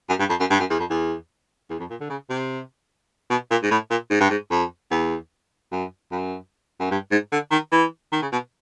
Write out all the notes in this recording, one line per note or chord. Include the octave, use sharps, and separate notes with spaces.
F#2
G2
F2
F#2
G2
F#2
E2
F2
E2
E2
F2
A#2
D3
C#3
C3
B2
A#2
G#2
A2
A#2
G#2
G2
G#2
F2
E2
F#2
F#2
F#2
G2
G#2
D3
D#3
E3
D#3
C#3
B2